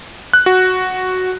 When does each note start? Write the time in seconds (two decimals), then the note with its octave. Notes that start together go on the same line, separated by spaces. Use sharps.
0.33 F#6
0.46 F#4